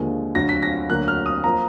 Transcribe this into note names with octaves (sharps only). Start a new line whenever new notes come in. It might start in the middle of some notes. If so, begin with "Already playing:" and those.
Already playing: D#2 D3 F3 G#3
D2 D3 F#3 A#6
B6
A#6
D2 D3 F#3 A#3 F#6
F6
D#6
F3 A#3 A#5